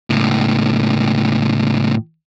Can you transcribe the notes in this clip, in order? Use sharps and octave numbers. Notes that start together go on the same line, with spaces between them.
C#2 A2